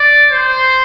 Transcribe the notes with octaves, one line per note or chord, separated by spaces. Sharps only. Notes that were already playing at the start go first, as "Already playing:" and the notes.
Already playing: D5
C5